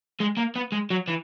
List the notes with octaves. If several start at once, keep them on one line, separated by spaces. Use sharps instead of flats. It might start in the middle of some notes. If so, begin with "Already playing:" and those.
G#3
A#3
B3
G#3
F#3
E3